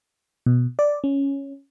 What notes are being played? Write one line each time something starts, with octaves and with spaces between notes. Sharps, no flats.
B2
D5
C#4